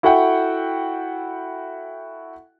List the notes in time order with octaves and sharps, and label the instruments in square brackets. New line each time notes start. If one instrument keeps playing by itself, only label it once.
[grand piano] E4 F#4 A4 E5 F#5 G5